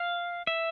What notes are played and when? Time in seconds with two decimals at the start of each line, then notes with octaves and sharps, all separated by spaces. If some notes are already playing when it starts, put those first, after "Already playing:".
Already playing: F5
0.47 E5